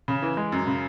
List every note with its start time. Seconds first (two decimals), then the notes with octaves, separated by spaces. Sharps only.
0.08 C#3
0.22 E3
0.37 G#3
0.52 F#2
0.67 C#3